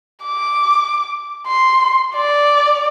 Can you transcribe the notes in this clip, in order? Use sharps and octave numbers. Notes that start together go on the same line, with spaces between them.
D6
C6
D5